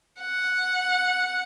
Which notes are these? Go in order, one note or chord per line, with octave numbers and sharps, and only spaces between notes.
F#5